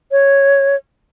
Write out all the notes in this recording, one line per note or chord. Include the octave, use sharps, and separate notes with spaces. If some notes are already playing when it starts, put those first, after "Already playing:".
C#5